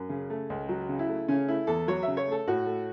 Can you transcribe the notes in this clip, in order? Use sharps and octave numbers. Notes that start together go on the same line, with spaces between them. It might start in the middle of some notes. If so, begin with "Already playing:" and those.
Already playing: F#2
C#3
A3
C#2
F#3
C#3
E4
A3
C#3 C#4
A3 E4
E2 A4
F#3 C#5
E5
C#3
C#5
A3 A4
A2 F#4
A3